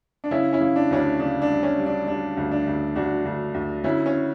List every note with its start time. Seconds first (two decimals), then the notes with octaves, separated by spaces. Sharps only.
0.24 D4
0.31 C#3 C#4 E4
0.53 C#4 E4
0.60 C#3
0.76 D4
0.90 D2 C#4
0.97 D4
1.19 C#3 D4
1.42 D4
1.49 G3
1.63 C#4
1.78 G3
1.86 D4
2.07 G3 D4
2.37 D2
2.52 D4
2.67 D2
2.95 D2 D4 F#4
3.25 D2
3.54 D2
3.84 D2 C#4 E4
4.06 C#4